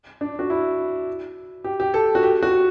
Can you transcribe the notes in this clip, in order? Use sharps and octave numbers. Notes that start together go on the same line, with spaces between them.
D4
F#4
E4
G4
G4
A4
F#4
G4
F#4